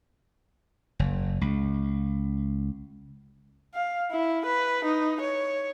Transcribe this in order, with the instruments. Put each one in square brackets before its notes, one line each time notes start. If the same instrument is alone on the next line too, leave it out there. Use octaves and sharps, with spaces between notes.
[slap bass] F#1
C#2
[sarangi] F5
E4
B4
D#4
C#5